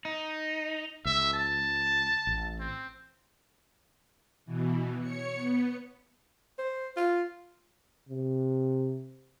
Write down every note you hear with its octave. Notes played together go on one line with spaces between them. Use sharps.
D#4
C#2 E5
A5
A1
C4
B2 E3
C#5 C#7
B3
C5
F4
C3